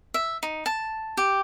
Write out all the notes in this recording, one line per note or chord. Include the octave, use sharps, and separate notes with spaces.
E5
D#4
A5
G4